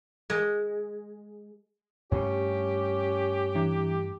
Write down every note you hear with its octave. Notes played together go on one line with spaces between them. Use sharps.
G#3
G2 A3 C#4 G4
E3 D4